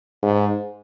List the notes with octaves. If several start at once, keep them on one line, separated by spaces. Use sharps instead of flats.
G#2